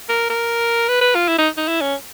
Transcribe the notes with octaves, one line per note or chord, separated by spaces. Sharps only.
A#4
A#4
B4
B4
F4
E4
D#4
D#4
E4
C#4